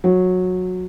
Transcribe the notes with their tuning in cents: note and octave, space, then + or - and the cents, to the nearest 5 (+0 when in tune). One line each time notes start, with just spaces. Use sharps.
F#3 -15